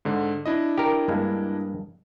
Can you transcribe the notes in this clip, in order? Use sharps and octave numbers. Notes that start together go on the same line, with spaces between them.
G#2 D3
D4 E4 D#5
G4 A#4
G2 G#3 A#3